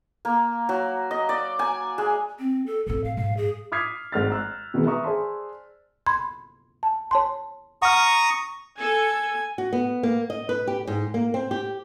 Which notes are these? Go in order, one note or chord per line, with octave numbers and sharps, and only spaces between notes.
A#3
F#3
D#5
D5
G#5
G#3
C4
A4
A2 C4 A4
F5
G#2 F5
G#4
D6 D#6 F6 G#6 B6 C7
G#1 G#2 F6 A6
A#5 E6 F#6
B2 D#3 E3 G#3 B3
B4 E5 A#5 C#6 D#6
G#4 C5 D5 A5 C6
B5 C6 G#6
A5
C#5 A5 C6
F#5 A#5 C#6 D#6 F6
A4 G#5
F#4
B3
A#3
D#5
B4
G4
G#2
A#3
C4
G4